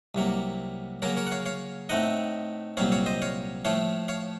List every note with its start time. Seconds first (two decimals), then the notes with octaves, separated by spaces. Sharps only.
0.15 C2 C3 F#3 A#3
1.02 C#3 F#3 A#3 A#4 C#5
1.17 A#4 C#5
1.27 F#5
1.31 C#5 F5
1.46 C#5 F5
1.89 A2 A3 C4 D#4 D#5 F#5
2.77 C2 A#2 F#3 C4 C#5 F5
2.92 C#5 F5
3.06 C5 D#5
3.22 C#5 F5
3.65 A2 F3 A3 C#5 F5
4.08 C#5 F5